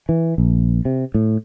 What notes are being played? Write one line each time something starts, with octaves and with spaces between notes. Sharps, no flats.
E3
A#1
C3
A2